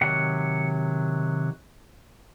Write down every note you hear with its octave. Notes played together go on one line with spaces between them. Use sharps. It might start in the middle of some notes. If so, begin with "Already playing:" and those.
C3 D#3 F#3 F#5